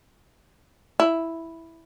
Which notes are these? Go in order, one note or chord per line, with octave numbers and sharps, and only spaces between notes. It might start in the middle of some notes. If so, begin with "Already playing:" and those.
E4